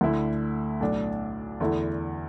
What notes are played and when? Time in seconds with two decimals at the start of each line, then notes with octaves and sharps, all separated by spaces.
0.01 D2 D3 A3 E4
0.80 B1 A2 A3 D4
1.60 E2 D3 A3 E4